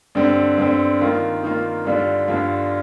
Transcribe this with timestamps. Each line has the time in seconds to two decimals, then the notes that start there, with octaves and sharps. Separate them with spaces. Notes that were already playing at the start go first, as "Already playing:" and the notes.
0.15 G2 D3 G3 C4
0.58 G2 D3 G3 C4
1.01 D#3 A#3 F4
1.43 D#3 A#3 F4
1.85 G2 D3 G3 D4 F4
2.28 G2 D3 G3 D4 F4